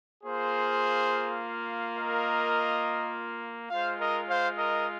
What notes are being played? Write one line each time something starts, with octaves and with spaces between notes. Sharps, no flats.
A#3 F4 G#4 C5
A#4 D#5
G#3 F4 C5 F5
A#4 D#5
C5 F5
A#4 D#5